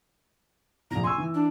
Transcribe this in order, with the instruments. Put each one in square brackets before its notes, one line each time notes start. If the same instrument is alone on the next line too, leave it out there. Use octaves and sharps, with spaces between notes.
[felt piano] F1 A#1 [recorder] A#5
[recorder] G#5 [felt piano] C6 C#6 E6
[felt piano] E3
[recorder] D4